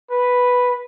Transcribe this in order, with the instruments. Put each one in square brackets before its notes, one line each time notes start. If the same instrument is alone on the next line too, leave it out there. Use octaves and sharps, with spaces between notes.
[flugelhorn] B4